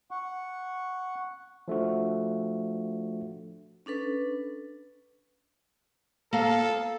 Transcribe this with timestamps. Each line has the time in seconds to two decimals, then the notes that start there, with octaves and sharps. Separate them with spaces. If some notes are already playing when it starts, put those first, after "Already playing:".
0.11 F#5 C#6
1.68 F3 A3 D4 F#4
3.86 C#4 D4 A4 B4
6.33 A#3 A4 F5